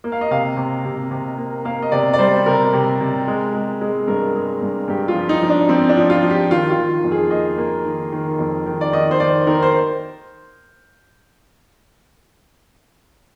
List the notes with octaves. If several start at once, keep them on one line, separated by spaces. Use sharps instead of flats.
A#3
F5
D#5
C3 F5
C3
C3
C3
A#3
A#3 F5
D#5
C3 D5
D5
G3 C5
C3 A#4
C3
C3
G#3
G#3
G#3
G2 A#4
G#3
G2
G2 G4
F4
F3
D#4
F3
D4
F3 C4
D4
F3
F4
F3
G4
D#3 F4
F4
D#3
F2
G#4
A#3 D#5
A#3
D#3
D#3
F2
D#3
D5
D#3 D#5
C5
D#3 D5
D#3 A#4
C5